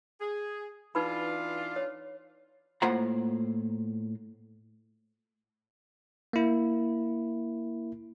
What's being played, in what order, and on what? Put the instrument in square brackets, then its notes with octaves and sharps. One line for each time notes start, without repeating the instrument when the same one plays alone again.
[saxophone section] G#4
[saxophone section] E3 D4 F4 [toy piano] D#4 B4 B5
[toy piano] C#5
[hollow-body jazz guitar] A2 A#3 F4 C5 F#5 A#5
[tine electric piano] A#3 E4